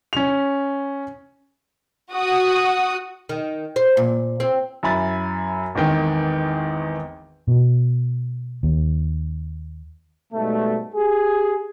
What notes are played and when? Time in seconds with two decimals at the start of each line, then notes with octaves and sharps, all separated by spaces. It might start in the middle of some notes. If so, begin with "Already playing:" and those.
0.13 C#4 F7
2.12 F#4 D#6
3.29 D#3
3.76 C5
3.97 A#2
4.40 C4
4.83 F#2 E4 G#5 B5 A6
5.75 G#1 E2 D#3 G5
7.48 B2
8.63 D#2
10.32 G#2 B2 G3 A3
10.94 G4 G#4